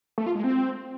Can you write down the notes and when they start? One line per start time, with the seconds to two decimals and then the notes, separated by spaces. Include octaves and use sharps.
0.18 A3
0.26 F4
0.35 G#3
0.44 C4